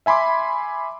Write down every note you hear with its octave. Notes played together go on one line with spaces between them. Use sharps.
E5 G#5 B5 C6 D6